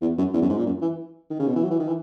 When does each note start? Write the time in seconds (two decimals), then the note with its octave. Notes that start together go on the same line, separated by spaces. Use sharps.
0.01 E2
0.18 F#2
0.33 E2
0.42 F#2
0.49 G#2
0.58 A#2
0.66 F#2
0.82 E3
1.30 D#3
1.39 C#3
1.47 B2
1.55 E3
1.63 F#3
1.71 E3
1.79 D#3
1.88 E3